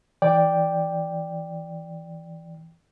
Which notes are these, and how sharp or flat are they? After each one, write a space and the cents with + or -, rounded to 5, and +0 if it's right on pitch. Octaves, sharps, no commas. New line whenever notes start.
E3 +0 D5 +0 G5 +5